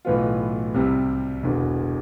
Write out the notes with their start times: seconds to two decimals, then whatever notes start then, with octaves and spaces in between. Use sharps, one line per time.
0.05 B1 A2 E3 B3 F4
0.74 C2 C3 G3 C4
1.43 E1 E2 D3